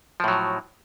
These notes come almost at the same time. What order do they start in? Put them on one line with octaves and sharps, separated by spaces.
F3 A2 F#3